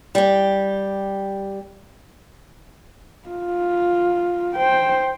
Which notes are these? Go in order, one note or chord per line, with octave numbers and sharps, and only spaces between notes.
G3 G4
F4
C5 G5